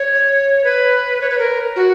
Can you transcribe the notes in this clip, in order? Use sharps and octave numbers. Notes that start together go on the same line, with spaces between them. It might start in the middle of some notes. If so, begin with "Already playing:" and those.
Already playing: C#5
B4
C#5
B4
A#4
F#4